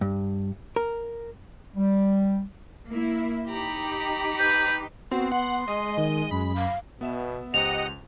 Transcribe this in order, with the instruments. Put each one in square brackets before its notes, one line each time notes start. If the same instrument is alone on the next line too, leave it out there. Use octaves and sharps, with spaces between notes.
[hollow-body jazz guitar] G2
A#4
[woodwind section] G3
[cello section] A#3 E4
[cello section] D#4 G4 [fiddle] A#5 B5
[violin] B4 B6 [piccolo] G6
[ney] B3 [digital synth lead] C4 [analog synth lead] F#4
[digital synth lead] F#5 [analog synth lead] C6
[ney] G#3 [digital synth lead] D#5
[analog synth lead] D#3
[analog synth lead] F#2 [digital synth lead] B5
[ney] F5
[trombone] B2 [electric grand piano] B3 E5 E7
[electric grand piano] C#2 C5 A#5 [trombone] G4 [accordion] D#5 F#5 [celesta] F7